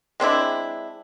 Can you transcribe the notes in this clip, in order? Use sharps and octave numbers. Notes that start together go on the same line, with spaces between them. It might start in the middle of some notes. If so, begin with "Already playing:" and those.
G#3 C4 D4 E4